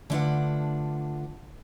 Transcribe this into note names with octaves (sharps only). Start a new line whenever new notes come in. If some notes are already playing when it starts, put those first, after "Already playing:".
D3 A3 D4 F4 B4 F#5